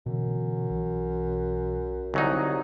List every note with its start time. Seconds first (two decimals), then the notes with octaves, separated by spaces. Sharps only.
0.06 F#2 B2 D3 E3
0.70 B1 E3
2.14 C2 D3 F#3 D#4